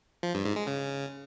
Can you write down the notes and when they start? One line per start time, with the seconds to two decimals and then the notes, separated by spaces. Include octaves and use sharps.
0.23 F3
0.34 G2
0.45 G#2
0.56 G#3
0.67 C#3